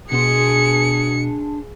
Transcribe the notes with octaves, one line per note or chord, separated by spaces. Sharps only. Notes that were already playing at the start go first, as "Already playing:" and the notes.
B2 D4 G#4 C6 C#7